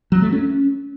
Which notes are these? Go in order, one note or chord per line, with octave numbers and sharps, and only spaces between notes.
F#3
A3
C#4